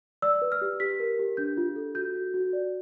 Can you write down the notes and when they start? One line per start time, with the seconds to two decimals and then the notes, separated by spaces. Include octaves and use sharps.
0.22 D5 E6
0.42 B4
0.52 F6
0.62 G4
0.80 G4 B6
1.00 A#4
1.19 G4
1.37 D4 G6
1.57 F4
1.76 A4
1.95 F#4 G6
2.15 F#4
2.34 F#4
2.53 D5